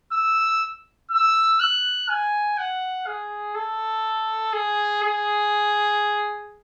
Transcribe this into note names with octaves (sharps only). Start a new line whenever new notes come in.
E6
E6
F#6
G#5
F#5
G#4
A4
G#4
G#4